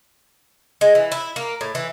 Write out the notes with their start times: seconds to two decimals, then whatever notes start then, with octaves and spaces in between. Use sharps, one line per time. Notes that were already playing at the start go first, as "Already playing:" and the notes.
0.81 G#3
0.95 E3
1.12 E4
1.36 A#3
1.61 A2
1.75 E3